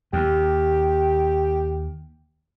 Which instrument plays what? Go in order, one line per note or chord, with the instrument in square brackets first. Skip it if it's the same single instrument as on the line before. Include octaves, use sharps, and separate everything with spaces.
[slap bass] D#2 [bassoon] G4